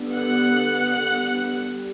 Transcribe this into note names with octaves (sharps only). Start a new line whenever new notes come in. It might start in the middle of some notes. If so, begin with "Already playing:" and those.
Already playing: D3 G3 B3
F#5
G3